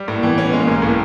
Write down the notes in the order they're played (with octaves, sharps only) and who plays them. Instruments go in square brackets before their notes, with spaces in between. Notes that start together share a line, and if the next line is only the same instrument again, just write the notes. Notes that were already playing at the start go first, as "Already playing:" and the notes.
Already playing: [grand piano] G3
[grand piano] A2 [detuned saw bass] A3
[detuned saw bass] A#3
[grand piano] E3 [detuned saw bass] B3
[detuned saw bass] B3 [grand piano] C#4
[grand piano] G#3 [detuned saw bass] A#3
[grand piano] B1
A2